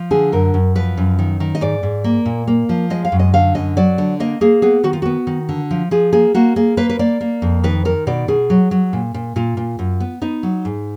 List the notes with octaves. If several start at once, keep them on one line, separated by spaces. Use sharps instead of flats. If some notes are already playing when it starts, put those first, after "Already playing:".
Already playing: F3
D3 G#4
F#2 A#4
F#2
F3 B4
F#2
D#3
D#3
D#5
G#2 D5
G#2
A#3
A#2
A#3
F3
G#3 D#5
F5
F#2
D#5
D3 F5
F#2 D#5
F#3 D5
D3
A#3 D#5
A#3 G#4
B3 G#4
D#3 F#4
F4
B3 F#4
D#3
D3
F3
F3 G#4
A#3 G#4
A#3 F#4
A#3 G#4
A#3 B4
B4
A#3 D5
A#3
F2
D#3 B4
D#3 A#4
B2 D5
B2 G#4
F#3
F#3
A#2
A#2
A#2 F4
A#2
F#2
B3
B3 D#4
F#3
G#2